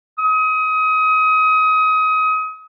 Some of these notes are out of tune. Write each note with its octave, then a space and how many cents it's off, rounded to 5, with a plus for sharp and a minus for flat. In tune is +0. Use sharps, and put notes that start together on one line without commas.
D#6 +30